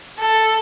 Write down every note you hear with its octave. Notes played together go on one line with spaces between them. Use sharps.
A4